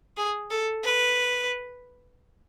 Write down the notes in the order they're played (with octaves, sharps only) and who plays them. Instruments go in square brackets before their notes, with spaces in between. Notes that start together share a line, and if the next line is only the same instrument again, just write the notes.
[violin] G#4
A4
B4